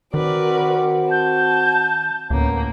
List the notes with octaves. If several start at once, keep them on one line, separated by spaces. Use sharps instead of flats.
D#3 C4 F#4 A#4 B4 D5
A5 G6
D2 A2 A#3 B3 C#4